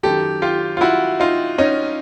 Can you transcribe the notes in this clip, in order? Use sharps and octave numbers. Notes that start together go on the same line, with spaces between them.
F#2 D#3 G4 A4
F4 G4
F4
E4 F#4
D#4 F4
C#4 D#4